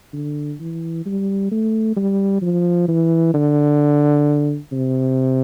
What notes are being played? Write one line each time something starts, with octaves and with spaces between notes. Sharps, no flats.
D3
E3
G3
A3
G3
F3
E3
D3
C3